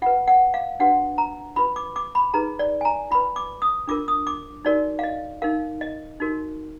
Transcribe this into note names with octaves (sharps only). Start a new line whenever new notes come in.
F4 B4 F#5
F#5
F5
D4 F#4 B4 F#5
A#5
F4 B4 B5
D6
D6
B5
D#4 G#4 B4 A#5
D5
G#5
A#5
F4 B4 B5
D6
D#6
D4 F4 A#4 D6
D#6
D6
D#4 F#4 A#4 D5
F5
D#5
D#4 A#4 F5
D#5
D#4 F#4 A#4